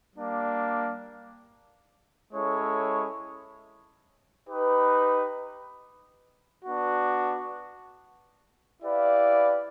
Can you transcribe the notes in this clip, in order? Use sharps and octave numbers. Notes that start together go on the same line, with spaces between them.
G3 A#3 D4
G#3 C#4 E4 A4 C#5
D#4 G4 B4
B3 D4 F#4
E4 G4 B4 D5 F5